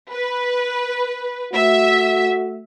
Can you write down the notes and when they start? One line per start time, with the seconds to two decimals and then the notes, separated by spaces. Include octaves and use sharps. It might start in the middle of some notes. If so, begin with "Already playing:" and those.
0.12 B4
1.53 A3 F#4 E5